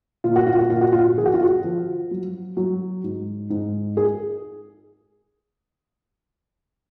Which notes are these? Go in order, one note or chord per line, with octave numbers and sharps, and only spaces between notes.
A#2 F4
F#4
F4
F#4
A#2 F4
F#4
F4
F3 G#4
F#4
F4
F#4
F3
F#3
F#3
G#2
G#2
G#4